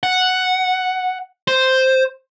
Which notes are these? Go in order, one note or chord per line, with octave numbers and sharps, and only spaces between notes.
F#5
C5